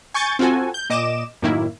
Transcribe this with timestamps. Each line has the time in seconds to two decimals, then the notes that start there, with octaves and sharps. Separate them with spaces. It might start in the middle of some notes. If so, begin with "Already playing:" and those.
0.14 G#5 C#6 G6 A6
0.39 C4 F4 F#4 A4 G#5
0.74 G6
0.90 A#2 D#5 D6 E7
1.42 F#2 A2 D#3 A#3 E4